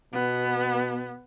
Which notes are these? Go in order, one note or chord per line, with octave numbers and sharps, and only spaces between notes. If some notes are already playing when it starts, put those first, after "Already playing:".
B2 B3